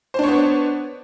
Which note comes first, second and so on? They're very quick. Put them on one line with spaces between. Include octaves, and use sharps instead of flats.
C5 D4 C#5 B3